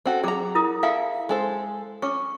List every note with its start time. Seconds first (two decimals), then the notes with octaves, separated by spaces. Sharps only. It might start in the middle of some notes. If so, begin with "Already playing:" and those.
0.06 C4 F#4 A4
0.24 F#3 G#4 A#5 D6
0.55 E4 A#4 D#6
0.83 E4 A4 E5 F5
1.29 G#3 A4 C5
2.02 C#4 C#6 D6